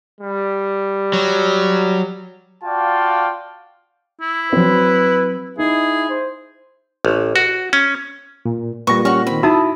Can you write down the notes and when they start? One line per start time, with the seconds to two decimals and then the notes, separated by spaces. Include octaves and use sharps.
0.21 G3
1.13 F#3
2.64 F4 F#4 D5 F5 G5 A5
4.21 E4
4.53 F#3 C4 B4
5.58 D#4 E4 G#4
6.10 C5
7.05 A1
7.36 F#4
7.73 C#4
8.46 A#2
8.87 A#2 G3 B4 C#6 A#6
9.05 G3 C#4 F#4 C#6 F6
9.27 D#3 C4 B5
9.43 D#4 E4 F#4 A5 D#6 E6